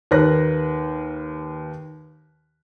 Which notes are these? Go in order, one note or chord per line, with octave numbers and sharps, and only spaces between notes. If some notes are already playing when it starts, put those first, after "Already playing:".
D#2 A#4 B4 F#6 A#6